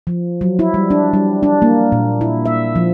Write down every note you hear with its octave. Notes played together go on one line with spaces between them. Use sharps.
F3
F#3
E4
G3
D4
G3
D4
A#3
A#2
E4
E5
F3